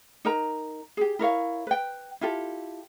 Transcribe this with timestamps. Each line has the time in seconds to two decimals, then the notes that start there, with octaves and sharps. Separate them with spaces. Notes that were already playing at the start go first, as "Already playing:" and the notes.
0.25 D#4 A#4 A#5
0.97 G4 G#4
1.19 E4 A#4 C#5 F5
1.67 B4 G5
2.21 E4 F4 G4 A4